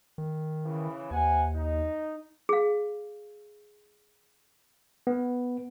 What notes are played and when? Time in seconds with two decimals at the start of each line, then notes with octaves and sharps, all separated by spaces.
0.18 D#3
0.65 C#3 E3
1.11 D#2 C3 F#5 G#5
1.56 D#4
2.49 G#4 F5
5.07 B3